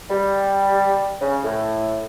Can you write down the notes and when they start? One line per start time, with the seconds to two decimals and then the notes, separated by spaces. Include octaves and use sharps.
0.10 G3
1.21 C#3
1.44 A2